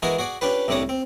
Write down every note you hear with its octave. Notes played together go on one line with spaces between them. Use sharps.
E3 G#3 F#4 G#4 A#4
F#4 G#4 D5
C#4 D4 F4 G4 B4
C2 A2 G3 D4 C#5 D#6
C4